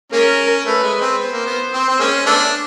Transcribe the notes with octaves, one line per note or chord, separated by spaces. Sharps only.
G#3 A#3 C#4 A#4
A3 B4
G#3
C4
B3 C5
A#3
B3
C4
C4
G#3 A#3 C#4
A3 B3 D4